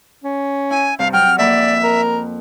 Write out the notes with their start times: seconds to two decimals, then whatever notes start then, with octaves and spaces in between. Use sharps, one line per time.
0.24 C#4
0.71 E4 G#5
0.99 G2 C3 F5
1.13 F#3 G5 F6
1.38 F2 A#3 D5 E5 B5
1.83 A#4